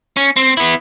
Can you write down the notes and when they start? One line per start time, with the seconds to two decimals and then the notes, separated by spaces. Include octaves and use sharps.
0.17 C#4
0.36 C4
0.57 B3 E4